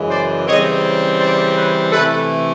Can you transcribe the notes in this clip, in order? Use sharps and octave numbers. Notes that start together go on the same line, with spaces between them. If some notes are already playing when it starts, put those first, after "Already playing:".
Already playing: F#2 C#3 E3 G#3
C5 D5
C#3 E3 G3 C4 C#5 D#5
C5 D5
B4 C#5
C3 E3 A3 A4 B4